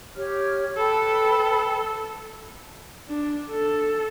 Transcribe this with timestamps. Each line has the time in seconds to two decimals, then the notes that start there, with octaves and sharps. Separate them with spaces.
0.16 G4 C#5 F6
0.77 A4 B4 G5 B5
3.09 D4
3.51 A4